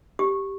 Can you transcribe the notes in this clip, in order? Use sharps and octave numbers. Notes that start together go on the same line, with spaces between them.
G4